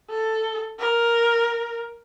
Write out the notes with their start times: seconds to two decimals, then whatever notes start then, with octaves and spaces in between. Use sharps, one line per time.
0.10 A4
0.78 A#4